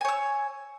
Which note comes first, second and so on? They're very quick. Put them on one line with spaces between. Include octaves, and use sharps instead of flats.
G#5 C#5 E6